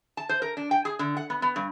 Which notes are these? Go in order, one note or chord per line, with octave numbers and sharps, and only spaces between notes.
A5
C5
A#4
D4
G5
G#4
D3
F#5
B3
B3
G2